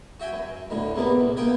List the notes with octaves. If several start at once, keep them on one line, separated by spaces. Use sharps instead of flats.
F#4 E5 G5 G#5
F#2
D2 A2 D3
E2 C3 A#3 B3
A#1
A#3 B3 A#4 G5 G#5